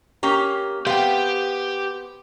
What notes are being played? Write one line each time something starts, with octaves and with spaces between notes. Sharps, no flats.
A#3 C#4 G4
B3 C4 G4 F5 G5